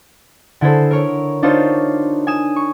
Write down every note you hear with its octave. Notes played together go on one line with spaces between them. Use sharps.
D3 E4 G#4 A4 C5
A#4 C#5
D4 D#4 F4 C5 C#5
G#5 D#6 E7
C#6